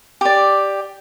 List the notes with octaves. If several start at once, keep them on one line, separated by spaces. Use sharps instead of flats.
G4 D5